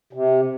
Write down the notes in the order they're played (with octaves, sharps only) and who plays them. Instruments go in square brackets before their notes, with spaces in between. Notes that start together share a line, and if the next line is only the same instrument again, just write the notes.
[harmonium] C3